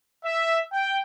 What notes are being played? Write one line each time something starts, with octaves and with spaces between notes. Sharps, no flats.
E5
G5